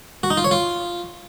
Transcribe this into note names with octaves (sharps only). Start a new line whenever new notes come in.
F#4
D#4
F4
C#5
F4